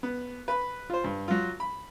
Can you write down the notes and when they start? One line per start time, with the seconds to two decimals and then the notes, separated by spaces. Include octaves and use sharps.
0.03 B3
0.48 B4 B5
0.90 F4 C5
1.04 G2
1.28 F#3 F4
1.60 B5